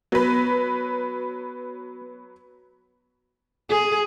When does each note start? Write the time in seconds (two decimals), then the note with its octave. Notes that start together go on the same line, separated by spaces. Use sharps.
0.12 F#3 B3 B4
3.70 G#4